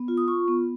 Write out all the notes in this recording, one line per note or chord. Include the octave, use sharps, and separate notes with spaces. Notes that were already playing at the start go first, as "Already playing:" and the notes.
Already playing: B3
F4
D#6
F4 C#6
B3